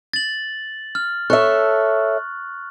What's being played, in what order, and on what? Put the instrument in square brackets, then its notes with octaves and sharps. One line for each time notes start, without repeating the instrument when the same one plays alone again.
[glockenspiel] A6 F#7
F6
[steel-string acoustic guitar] A4 C#5 E5 [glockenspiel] C#6 F#6